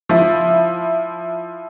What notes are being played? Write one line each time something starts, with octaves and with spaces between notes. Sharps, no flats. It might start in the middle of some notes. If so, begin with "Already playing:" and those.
F3 E4